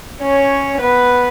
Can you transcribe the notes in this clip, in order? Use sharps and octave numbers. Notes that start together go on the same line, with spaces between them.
C#4 C#5
B3 B4